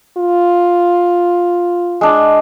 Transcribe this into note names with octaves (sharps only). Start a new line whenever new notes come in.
F4
G#3 D4